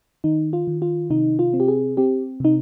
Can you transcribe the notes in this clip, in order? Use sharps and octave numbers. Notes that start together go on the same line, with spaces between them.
D#3 D#4
F4
D#3
F4
C3 D#4
F4
C4
G4
G#4
C4 G4
C3 D#4